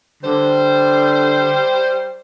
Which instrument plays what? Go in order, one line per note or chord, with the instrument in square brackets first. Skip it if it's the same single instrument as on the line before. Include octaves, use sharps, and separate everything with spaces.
[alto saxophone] D3 [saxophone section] G3 C5